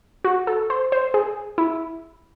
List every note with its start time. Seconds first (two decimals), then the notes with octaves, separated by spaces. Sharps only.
0.24 F#4
0.47 A4
0.70 C5
0.92 C5
1.14 G#4
1.58 E4